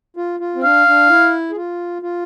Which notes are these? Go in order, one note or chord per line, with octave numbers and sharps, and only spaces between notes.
F4
F4
C4
D4 F5
D4
E4
G#4
F4
F4